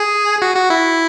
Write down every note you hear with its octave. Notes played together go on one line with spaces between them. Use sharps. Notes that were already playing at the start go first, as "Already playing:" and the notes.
Already playing: G#4
F#4
F#4
E4